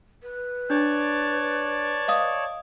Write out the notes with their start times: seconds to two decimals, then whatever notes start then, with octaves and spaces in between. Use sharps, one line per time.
0.23 B4
0.70 D4 C#5 D5 A5
2.08 D#5 F5 D#6